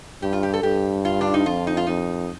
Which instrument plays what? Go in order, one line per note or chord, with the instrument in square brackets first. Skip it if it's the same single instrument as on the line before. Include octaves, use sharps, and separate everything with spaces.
[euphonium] G2 [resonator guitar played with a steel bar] G4
[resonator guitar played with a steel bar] F4
G4
A4
[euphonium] G2 [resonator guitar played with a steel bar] G4
[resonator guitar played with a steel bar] F4
D4
D#4
[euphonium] F2 [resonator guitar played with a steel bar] F4
[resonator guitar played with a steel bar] D#4
F4
[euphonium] F2 [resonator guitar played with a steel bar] D#4